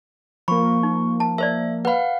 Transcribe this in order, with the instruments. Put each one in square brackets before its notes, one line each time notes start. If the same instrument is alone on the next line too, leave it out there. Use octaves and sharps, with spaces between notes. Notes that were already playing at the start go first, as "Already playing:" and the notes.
[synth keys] F3 A#3 [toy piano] B5 [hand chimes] C#6
[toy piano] D#4
A5
[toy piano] A#4 C5 D5 [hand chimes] E5
[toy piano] B4 B5 [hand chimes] F5 F#5